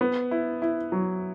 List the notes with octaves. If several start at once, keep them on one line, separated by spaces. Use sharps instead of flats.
B3
E4
E4
F#3